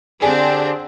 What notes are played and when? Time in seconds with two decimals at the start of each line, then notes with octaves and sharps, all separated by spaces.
0.22 D3 C4 D4 G4 G#4 D5